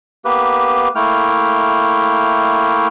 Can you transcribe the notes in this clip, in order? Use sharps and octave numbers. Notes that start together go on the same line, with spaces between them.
A#3 B3 G4 B4
A3 A#3 E4 G5 F6